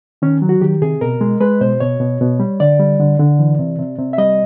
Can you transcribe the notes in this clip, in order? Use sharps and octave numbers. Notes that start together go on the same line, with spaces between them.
D#3 C#4
F#3
F#4
D#3 G4
C3 G#4
B2 A#4
G#3
G#3 B4
B2 C5
B2 C#5
B2
B2
G3
D3 D5
G3
D3
D3
E3
C3
C3
C3
E5
G3 D#5